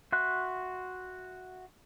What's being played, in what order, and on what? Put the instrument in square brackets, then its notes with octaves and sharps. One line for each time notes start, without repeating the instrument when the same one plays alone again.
[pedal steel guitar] F#4 E5 C6 F#6